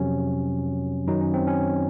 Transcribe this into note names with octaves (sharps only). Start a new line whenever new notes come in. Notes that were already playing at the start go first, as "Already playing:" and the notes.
Already playing: F2 C3 F#3 C#4
F#2 D#3 F#3 D#4
C#4
C4
C#4